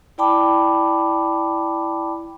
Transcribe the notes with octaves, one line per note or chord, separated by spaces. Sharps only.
E4 D5 G5 A5 B5 D6